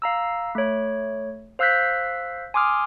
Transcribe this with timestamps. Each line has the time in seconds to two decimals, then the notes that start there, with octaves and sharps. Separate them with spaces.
0.02 F5 A#5 E6
0.55 A3 C#5
1.59 C5 F5 E6 F#6 G6 B6
2.54 G#5 C6 D6 D#6 F6